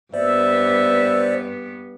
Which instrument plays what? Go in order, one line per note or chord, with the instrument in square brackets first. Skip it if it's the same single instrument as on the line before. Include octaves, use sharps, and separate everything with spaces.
[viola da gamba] G2 B3 [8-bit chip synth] C5 D5 [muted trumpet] E5